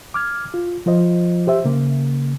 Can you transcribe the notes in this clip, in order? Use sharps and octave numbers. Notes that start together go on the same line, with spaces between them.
D6 F6 G#6
F4
F3 F4 C5 D#5
G4 C5 E5
C#3 A#3